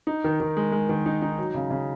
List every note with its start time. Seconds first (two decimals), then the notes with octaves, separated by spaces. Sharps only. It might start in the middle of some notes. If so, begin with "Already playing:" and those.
0.07 D#4
0.24 D#3
0.40 D#3
0.57 G#3
0.72 G#3
0.89 D#3
1.06 D#4
1.22 D#4
1.38 F#3
1.54 C#3
1.71 C#3